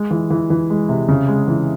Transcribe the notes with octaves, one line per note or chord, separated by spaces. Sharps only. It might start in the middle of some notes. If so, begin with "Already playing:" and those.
Already playing: G#3
E3
E3
E3
G#3
C3
C#3
G#3
E3